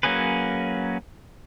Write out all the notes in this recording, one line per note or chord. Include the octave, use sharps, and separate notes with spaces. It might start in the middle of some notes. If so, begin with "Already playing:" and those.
F#3 A#3 C#4 G#4 B4